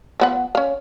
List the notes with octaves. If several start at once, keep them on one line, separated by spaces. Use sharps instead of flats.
F3 B3 F#5
C#4 F5